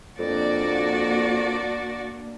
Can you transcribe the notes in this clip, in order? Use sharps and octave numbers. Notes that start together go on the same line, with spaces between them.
F2 A#3 D4 F#4 D5